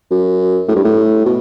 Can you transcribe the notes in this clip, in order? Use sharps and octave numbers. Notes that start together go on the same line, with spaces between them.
F#2
A2
G2
A2
B2